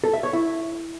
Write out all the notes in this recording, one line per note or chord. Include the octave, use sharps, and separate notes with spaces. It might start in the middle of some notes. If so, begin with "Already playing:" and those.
A4
E5
C#5
E4